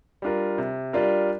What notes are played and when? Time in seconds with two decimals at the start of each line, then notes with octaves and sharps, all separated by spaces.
0.22 G3 D4 F4 A#4
0.58 C3
0.93 G3 D4 F4 A#4